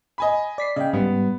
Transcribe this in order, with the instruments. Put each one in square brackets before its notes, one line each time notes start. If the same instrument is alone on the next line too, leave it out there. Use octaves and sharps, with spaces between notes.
[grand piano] D#5 G#5 B5
[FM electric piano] D5 B6 C7
[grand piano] C#3 [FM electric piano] D#5 G5
[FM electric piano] G#2 G3 [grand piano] B3